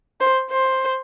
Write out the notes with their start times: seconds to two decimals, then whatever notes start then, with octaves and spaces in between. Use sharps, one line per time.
0.21 C5
0.51 C5